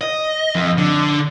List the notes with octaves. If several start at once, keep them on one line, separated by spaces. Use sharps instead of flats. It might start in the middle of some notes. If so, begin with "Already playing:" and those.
D#5
F2
D3